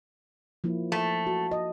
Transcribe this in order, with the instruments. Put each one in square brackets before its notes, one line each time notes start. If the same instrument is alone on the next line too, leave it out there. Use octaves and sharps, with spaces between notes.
[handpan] F3 A#3 E4
[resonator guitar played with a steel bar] A3
[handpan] F#4
D#5